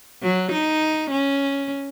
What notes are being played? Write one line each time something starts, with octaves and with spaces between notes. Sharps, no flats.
F#3
D#4
C#4